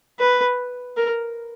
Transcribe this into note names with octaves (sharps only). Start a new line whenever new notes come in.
B4
A#4